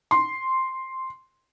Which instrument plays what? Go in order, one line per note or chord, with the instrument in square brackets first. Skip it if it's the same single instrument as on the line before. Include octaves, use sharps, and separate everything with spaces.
[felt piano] C6